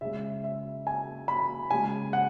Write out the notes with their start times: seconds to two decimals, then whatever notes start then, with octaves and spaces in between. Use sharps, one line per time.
0.01 C#3 G#3 E5
0.44 E5
0.87 G#5
1.28 B5
1.71 C#3 G#3 G#5
2.13 F#5